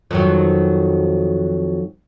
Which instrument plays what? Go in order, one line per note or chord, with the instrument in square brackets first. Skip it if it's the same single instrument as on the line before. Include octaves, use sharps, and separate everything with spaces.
[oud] F2 D#3 F#3